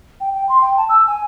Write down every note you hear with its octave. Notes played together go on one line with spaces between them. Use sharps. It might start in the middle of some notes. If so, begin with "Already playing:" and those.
G5
G5
C6
G5
A5
E6
G#5